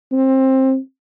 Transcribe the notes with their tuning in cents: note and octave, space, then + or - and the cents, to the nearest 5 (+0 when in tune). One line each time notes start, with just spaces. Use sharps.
C4 +20